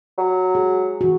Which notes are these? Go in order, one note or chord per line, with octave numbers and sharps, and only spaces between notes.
F#3
G#4
E3 F#4